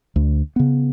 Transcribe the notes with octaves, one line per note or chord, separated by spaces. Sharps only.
D2
C#3 B3